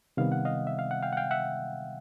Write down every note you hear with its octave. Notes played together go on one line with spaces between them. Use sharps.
C3 D#3 G3 B3 F5
F#5
D#5 F5
E5
F5
F#5
F5 G5
F#5
F5 G5
E5 F#5